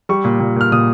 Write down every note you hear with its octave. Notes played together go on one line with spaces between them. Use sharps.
G3 C#6
A#2
A#2
A#2 F6
A#2 D#6